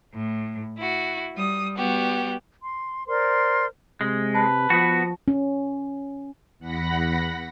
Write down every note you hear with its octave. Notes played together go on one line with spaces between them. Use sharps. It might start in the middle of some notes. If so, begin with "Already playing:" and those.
A2
E4 F#4
G3 D#6
G3 B3 F#4 G4
C6
A#4 C5 D5 C6
C3 G#3
B4 A5
F3 B3 F#4
C#4
E2 F#5 B5 A#6